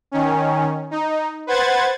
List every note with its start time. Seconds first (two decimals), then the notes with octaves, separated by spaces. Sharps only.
0.12 D#3 C#4
0.91 D#4
1.47 B4 C5 F#5 G#6 A6